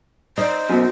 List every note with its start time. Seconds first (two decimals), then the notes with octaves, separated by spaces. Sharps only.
0.38 D#4 C5
0.69 F#2 B2